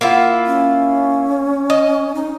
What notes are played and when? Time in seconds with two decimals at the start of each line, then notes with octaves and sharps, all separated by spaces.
0.01 A#3 E4 F4 F#5
0.46 C#4
1.70 D#5
2.15 D#4